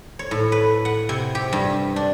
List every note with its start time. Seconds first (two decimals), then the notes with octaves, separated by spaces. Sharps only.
0.19 C#5
0.31 A2
0.52 B4
0.85 F#5
1.09 C3
1.35 G4
1.53 G2
1.96 D4